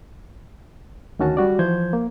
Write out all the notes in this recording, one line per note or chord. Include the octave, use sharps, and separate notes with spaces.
D2 D#3 C#4 F#4 A5
G3 F#4 D5
E3 F3 C5 G6 G#6
A#3